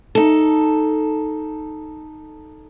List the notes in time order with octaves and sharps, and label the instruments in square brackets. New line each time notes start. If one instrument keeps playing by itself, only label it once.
[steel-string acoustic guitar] D#4 A4